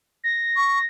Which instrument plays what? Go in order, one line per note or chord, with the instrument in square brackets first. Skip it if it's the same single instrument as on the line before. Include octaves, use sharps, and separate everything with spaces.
[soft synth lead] A#6
[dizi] C#6